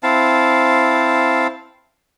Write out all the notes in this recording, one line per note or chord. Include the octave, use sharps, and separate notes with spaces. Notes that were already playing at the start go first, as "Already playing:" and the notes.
C4 E4 F5 A5